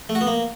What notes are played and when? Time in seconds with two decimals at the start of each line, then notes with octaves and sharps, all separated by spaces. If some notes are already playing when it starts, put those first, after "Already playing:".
0.09 A3
0.15 F#4
0.21 B3
0.27 A#3